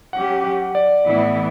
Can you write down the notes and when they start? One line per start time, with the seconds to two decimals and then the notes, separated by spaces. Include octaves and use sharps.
0.13 F#3 C#4 G4 F#5
0.44 F#5
0.75 D5
1.06 A2 E3 B3 E4